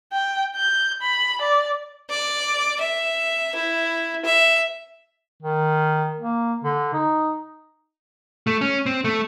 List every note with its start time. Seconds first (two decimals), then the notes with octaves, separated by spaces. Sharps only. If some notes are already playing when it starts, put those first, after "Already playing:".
0.13 G5
0.56 G6
1.02 B5
1.41 D5
2.10 D5
2.81 E5
3.55 E4
4.25 E5
5.42 D#3
6.18 A#3
6.64 D3
6.93 D#4
8.47 A3
8.61 C#4
8.86 C4
9.04 A3